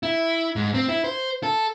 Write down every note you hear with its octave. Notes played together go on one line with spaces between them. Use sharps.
E4
G#2
C4
E4
C5
A4